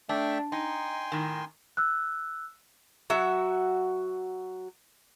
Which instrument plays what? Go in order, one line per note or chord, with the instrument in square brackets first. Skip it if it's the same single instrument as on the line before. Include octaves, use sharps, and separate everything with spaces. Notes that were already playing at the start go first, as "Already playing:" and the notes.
[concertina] A3 E5 G5 [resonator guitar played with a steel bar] D4
[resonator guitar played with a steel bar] D#4 [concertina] G5 G#5 C6
[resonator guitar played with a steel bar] A2 D#3
[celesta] E6 F#6
[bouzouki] F#3 F#4 E5